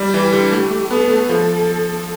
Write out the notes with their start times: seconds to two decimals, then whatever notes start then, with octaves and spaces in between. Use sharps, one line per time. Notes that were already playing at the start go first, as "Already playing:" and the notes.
Already playing: G3
0.13 E3 G4
0.33 D3
0.52 A3 G4
0.71 A3
0.90 B3 A4
1.10 A3
1.29 F3 A4